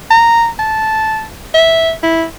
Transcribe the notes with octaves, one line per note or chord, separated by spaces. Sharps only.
A#5
A5
E5
E4